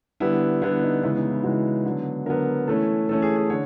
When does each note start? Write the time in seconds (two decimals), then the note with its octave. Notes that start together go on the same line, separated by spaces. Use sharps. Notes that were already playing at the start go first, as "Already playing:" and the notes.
0.20 D3 G3 B3 E4
0.62 D3 G3 B3 E4
0.83 D#4
1.03 C#3 E3 G#3 B3 E4
1.17 D#4
1.30 E4
1.43 C#3 E3 G#3 B3 F#4
1.85 D3 F#3 B3
2.26 D3 F#3 B3 A#4
2.67 E3 A3 C#4 A4
3.09 E3 A3 C#4 A4
3.22 G#4
3.36 G#4
3.50 D3 C#5